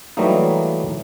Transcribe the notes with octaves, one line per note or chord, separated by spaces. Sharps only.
E3 F#3 G3 A3 A#3 D#4